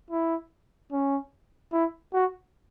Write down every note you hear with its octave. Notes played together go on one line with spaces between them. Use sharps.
E4
C#4
E4
F#4